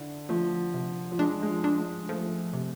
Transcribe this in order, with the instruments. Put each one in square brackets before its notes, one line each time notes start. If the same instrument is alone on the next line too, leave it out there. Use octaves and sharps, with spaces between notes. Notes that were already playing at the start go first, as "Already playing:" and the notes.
Already playing: [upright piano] D3 [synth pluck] E4
[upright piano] F3 [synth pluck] A3
[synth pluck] C3
[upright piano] F3
[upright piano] G#3 [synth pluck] D4
[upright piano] G#3
F3
[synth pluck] D4
[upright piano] G#3
[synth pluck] F3 [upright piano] A3
[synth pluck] C3